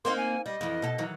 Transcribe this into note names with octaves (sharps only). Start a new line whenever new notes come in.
A#3 C4 D#4 C6
G#5
G3 D#5
F2 E3
B2 A4
D#3 E3 F#3